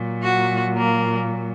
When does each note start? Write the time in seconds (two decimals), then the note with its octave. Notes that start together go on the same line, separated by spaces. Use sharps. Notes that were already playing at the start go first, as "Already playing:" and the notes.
Already playing: A#2 F#3
0.22 F#4
0.78 A#3